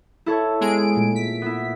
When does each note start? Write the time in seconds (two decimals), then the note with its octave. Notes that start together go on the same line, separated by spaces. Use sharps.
0.26 E4 A4 C#5
0.61 G#3 B3 G#4 D7
0.95 A#2 A3
1.15 B6
1.42 B3 E4